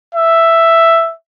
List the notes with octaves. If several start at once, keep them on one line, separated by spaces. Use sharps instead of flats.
E5